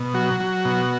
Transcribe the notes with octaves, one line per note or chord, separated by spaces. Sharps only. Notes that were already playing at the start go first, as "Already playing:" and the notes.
Already playing: B2
F#3 F#4
F#3
B2